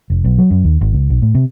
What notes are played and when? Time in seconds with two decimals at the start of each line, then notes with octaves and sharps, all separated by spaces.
0.10 F1
0.24 B1
0.39 F#3
0.51 F#2
0.64 D#2
0.81 G#1
0.93 C#2
1.10 B1
1.22 A2
1.35 C3